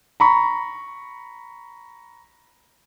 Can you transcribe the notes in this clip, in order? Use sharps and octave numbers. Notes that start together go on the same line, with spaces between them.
A#5 B5 C#6